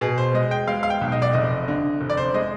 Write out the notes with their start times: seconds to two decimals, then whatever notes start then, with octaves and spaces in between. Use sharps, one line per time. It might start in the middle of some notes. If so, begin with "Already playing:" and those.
0.01 B2 G#4
0.18 C5
0.34 G#3 D#5
0.51 G5
0.67 G#3 F5
0.83 F5
0.90 G5
1.01 B1
1.12 D#5
1.22 D5
1.33 F1 D#5
1.68 D3
2.01 F1
2.10 D5
2.17 C5
2.34 G#3 D#5